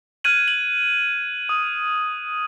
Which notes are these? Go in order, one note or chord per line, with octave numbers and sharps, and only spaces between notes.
F6 F#6 G#6 D#7 F#7
F#7
D#6